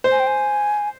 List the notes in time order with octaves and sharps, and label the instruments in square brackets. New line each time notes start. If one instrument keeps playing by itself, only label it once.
[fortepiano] C5
[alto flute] G#5
G5
G#5